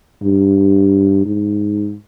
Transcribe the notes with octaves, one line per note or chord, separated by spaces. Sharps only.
G2
G#2